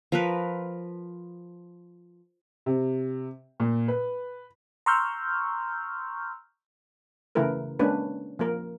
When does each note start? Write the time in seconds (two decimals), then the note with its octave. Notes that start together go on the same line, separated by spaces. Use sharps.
0.12 F3 A#4 B4
2.66 C3
3.60 A#2
3.88 B4
4.86 A#5 C6 C#6 E6 F6 G6
7.35 C#3 E3 A3 E4 A#4 B4
7.79 G#3 A#3 C#4 D4 B4
8.39 F3 A#3 A#4